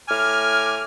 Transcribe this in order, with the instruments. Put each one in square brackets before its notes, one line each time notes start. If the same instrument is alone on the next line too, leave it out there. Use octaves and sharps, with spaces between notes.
[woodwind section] A2 G#5 D6 F6